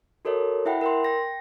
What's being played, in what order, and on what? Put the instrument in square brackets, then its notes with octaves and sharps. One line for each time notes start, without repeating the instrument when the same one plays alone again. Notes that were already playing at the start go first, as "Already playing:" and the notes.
[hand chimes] F#4 A4 A#4 C#5 D#5
E4 E5 F#5 G5 B5
A#4 G5 C6
G5 A#6